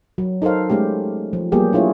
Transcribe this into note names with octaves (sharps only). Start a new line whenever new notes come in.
F#3
D#4 A4 A#4 C5 F5
G#3 A3 C#4 G4
F3
F#3 G3 A#3 B3 G4 G#4
D4 E4 F4 G#4 C#5